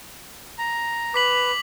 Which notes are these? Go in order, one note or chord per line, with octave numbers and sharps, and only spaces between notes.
A#5
B4 D6 B6 F#7